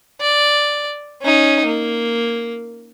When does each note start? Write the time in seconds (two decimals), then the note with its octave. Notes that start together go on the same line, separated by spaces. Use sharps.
0.21 D5
1.22 C#4 D#4
1.66 A#3